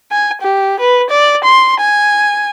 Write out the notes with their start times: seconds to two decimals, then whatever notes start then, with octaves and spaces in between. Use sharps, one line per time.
0.11 G#5
0.42 G4
0.80 B4
1.10 D5
1.44 C6
1.80 G#5